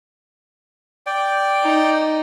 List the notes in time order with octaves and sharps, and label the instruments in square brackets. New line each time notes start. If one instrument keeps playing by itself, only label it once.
[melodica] D5 G5
[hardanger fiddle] D#4